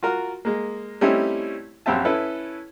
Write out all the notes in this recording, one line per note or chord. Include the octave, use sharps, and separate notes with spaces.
F4 F#4 A#4
G#3 A#3
G3 A3 C4 C#4 D#4 E4
A#1 F#2 C4 G4 E5 A5
C#4 E4 A4 B4